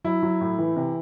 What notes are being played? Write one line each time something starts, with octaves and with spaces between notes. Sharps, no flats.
F#3 E4
F#3
A2
E3
C3